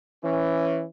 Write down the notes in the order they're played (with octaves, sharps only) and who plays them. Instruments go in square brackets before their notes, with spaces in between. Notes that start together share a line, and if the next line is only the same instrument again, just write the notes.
[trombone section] E3 C#4